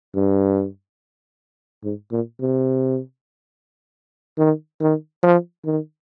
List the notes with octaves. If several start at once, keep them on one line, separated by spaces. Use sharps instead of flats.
G2
G#2
A#2
C3
D#3
D#3
F3
D#3